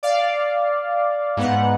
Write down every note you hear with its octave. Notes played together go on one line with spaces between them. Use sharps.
D5 F5
G#2 B3 F#5